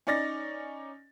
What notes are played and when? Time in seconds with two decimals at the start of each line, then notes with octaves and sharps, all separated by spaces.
0.07 C#4 D#4 D5 A6 A#6